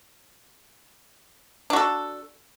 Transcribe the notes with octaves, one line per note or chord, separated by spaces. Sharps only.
D4 F#4 A4